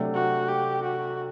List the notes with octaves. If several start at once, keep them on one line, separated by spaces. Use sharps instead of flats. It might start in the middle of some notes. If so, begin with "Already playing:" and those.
Already playing: C3 F#3 A3 D4
F#4
G4
F#4